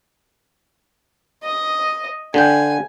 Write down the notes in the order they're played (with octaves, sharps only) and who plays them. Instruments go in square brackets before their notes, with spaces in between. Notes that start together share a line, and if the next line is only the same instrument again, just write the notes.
[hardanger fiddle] D#5
[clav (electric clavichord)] D3 G5 [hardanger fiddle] G#5